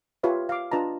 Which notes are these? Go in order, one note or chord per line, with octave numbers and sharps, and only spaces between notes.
F4 G4 B4 C#5 E5
F5 D6
D4 F4 B4 D#5 A5 A#5